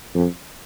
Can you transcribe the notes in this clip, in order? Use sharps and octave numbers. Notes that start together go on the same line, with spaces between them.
F2